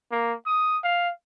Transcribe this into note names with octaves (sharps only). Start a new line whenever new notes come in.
A#3
D#6
F5